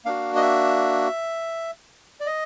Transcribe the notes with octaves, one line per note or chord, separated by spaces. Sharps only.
A#3 D4 F#4 F5
D#5
E5
D5
D#5